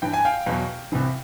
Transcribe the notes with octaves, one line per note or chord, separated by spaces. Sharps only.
G2 E3 G5
G#5
F5 G5
E2 B2 F#3
C2 C3 E3